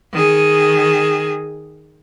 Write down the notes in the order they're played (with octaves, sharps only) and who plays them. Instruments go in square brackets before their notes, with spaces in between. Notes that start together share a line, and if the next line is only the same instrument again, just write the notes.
[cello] D#3 G#4